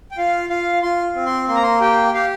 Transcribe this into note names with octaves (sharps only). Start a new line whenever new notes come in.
G5
F4 F5
F4 F5
F4 C6
C4
C6
A#3 C6
A#5
C6
G4 G5
G4 F5